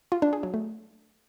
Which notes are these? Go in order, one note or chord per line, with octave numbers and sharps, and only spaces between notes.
F4
D4
G#4
F#3
A3